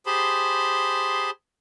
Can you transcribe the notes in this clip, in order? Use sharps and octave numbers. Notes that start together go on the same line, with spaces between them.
G4 G#4 C5 A5 B5 C6